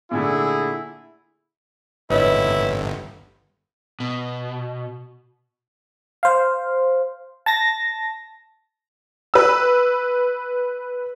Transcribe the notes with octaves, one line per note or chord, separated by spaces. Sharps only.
A#2 D3 A3 E4 G#4
G1 E4 B4 C#5 D#5
B2
C5 F5
A5 A6 A#6
B4 E6